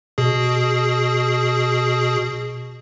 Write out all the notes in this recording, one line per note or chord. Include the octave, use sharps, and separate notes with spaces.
B2 G#4